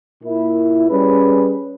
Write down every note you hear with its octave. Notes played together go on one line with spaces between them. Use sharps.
A#2 A#3 E4
G3 C#4 G#4 B4